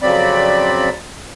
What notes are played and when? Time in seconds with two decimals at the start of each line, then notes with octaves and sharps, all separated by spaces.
0.02 F2 C#3 F#3 C4 D5 B5